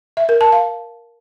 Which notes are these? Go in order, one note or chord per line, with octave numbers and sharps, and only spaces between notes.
E5
A#4
A5
F5